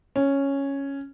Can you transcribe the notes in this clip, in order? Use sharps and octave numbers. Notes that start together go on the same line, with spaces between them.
C#4